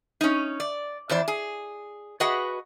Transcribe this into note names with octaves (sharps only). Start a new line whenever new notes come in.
C#4 D#4
D5
F2 E3 C5 D5
G#4
F#4 G#4 B4 D#5 F#5